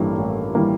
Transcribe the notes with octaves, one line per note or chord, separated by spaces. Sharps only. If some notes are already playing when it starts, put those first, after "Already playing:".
Already playing: A1 G2 E3 G3 A#3 A4
A1
E3 G3 A#3